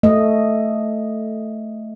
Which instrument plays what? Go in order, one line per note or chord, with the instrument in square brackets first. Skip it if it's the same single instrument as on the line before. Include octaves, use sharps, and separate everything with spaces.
[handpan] A3 D#5